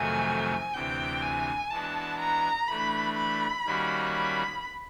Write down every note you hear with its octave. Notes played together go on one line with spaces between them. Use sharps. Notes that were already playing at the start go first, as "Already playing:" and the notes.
Already playing: F2 C3 D#3 F#3 A3 G#5
D2 C3 E3 G5
G#5
E3 G#3 B3 D4 F#4 A5
A#5
E3 A3 D4 B5
B5
D#3 G3 A#3 C#4 F#4
B5